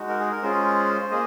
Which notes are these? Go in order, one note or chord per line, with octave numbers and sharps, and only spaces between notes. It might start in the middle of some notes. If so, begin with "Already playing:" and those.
Already playing: G#3 D#4 F#4
A#4
G#4
A#4
G#3 C#4 F4 G#4 C5
A#3 G#4 D#5